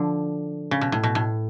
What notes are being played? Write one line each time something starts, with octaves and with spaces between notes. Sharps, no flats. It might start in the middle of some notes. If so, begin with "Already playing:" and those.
Already playing: D3 F3
C#3
B2
A2
B2
A2